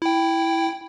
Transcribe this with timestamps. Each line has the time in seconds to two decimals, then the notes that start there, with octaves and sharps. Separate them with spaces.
0.02 E4 G5